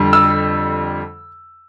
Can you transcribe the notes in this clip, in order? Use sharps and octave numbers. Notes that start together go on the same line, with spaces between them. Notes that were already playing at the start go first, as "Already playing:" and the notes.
Already playing: F2 D3 G3
E6